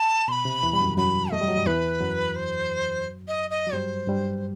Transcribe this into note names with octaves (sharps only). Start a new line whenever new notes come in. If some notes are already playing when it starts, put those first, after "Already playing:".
Already playing: A5
B2 B5 C6
C3
E2 E3
G3
F#2 F#3
F#2 F#3 B5
A3 D#5
G3
F#3
G2 G3
E2 E3 B4
F#2 F#3
C5
D#5
D#5
F#3
G2 G3 C5
G2 G3